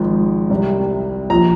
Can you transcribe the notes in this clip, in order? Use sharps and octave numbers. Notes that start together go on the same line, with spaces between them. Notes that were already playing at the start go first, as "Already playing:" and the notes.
Already playing: G#1 G#2 F3
C2 C3 G3
A#1 F3 A#5